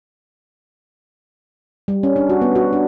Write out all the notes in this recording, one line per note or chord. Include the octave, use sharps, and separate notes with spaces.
G3
C#4
D4
F#4
B3
F#4
D4